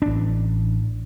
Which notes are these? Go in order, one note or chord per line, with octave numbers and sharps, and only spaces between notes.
A1 D4